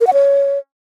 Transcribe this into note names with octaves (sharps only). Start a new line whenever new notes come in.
A#4
F#5
C#5